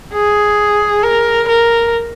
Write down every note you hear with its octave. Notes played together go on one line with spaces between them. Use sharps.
G#4
A#4
A#4